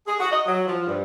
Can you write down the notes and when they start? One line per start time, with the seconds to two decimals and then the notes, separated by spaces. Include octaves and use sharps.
0.07 G#4
0.19 F#4
0.32 D#5
0.46 F#3
0.67 F3
0.87 G2